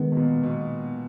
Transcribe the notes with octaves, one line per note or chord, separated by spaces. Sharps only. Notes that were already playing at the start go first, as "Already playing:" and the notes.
Already playing: D#3 G#3 B3
B2
A#2
B2